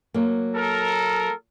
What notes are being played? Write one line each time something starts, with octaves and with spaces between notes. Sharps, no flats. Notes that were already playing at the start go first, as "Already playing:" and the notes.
F#3 A#3
A4 A#4